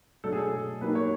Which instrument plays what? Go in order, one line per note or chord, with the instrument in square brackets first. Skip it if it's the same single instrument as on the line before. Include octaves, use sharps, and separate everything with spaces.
[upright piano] B2 F#3 A3 D4 [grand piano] A4
[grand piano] G#4
A4
[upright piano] F#3 A#3 D#4 G4 A#4 [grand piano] B4
[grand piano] C#5